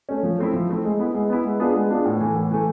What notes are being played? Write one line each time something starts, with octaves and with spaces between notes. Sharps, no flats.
A3 C#4
F3
A3 C4 E4
F3
A3 C4 E4
G#3
B3 E4
G#3
B3 E4
G#3
B3 D4 F4 G#4
G#3
B3 D4 F4 G#4
A2
E3 A3
A2
E3 A3